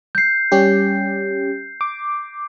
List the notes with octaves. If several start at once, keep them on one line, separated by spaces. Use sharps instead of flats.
G6 C7
G3 C#4 G4
D6